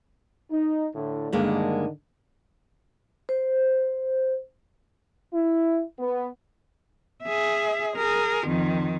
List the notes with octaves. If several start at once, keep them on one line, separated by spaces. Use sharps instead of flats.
D#4
A2 D3
G2 D3 D#3 G#3 A#3
C5
E4
B3
G#4 E5
G#4 A#4
F2 D#3